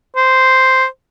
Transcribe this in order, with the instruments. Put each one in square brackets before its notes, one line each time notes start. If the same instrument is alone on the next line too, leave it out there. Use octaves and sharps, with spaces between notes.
[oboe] C5